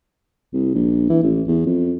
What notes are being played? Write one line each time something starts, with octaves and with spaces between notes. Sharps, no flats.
C2
A#1
E3
A1
E2
F2